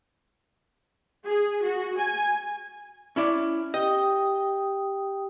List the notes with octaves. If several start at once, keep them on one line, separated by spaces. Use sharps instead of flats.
G#4
F#4
G#5
C#4 E4 D5
G4 D#5 G5 D#6